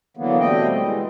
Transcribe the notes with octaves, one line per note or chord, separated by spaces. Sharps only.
D3 E3 F#3 A#3 B3
B2 G3 A3 C4 D#5 G5
E3 G#3